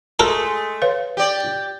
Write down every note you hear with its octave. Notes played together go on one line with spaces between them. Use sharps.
G#3 A3 A4 A#4 A#5
B4 C#5 F5
G4 D5